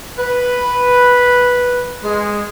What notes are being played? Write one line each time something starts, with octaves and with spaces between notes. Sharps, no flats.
B4
G#3